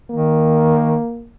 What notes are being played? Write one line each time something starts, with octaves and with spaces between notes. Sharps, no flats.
D#3 A#3